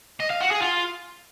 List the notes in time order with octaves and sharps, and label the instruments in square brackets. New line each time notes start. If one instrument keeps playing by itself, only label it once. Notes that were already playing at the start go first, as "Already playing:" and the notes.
[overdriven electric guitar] D#5
F5
F#4
G#4
F4